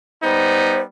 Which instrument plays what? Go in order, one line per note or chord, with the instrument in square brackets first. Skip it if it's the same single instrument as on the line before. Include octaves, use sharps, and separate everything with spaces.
[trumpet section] G3 B3 D#4 [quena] C5